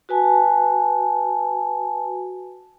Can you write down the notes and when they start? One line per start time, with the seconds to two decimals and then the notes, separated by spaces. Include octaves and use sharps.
0.09 F#4 B4 G#5 A5